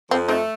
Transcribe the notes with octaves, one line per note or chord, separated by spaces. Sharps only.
F2 C4
A3 C4 D#4